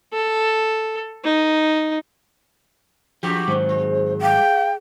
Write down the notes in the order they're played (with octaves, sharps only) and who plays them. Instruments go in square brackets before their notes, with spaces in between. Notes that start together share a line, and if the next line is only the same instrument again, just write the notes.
[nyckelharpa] A4
D#4
[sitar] F#2 F#4 G4 [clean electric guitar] F3
[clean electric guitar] G#2 D#3 F#3 [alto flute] C5
[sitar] G#3
[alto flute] F5 [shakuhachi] G5